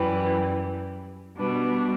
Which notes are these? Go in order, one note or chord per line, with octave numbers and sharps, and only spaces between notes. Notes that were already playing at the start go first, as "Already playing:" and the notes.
Already playing: F#2 E3 G3 B4
B2 G3 D4 B4